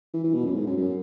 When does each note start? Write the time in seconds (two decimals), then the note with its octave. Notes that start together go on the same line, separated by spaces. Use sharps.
0.14 E3
0.24 E3
0.34 B2
0.45 F#2
0.56 G#2
0.66 F#2
0.77 F#2